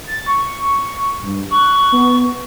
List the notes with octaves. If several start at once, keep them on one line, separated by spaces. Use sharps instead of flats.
A6
C#6
G2
C#6 F#6
B3